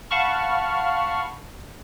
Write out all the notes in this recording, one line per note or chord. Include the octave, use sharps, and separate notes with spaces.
F5 F#5 A5 B5 C#6 F6